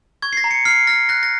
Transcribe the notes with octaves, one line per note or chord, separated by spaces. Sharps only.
C#6 G#6
C7
A#6
A#5
C#7
F6 C7
F6 A#6
F#6 A#6
A#6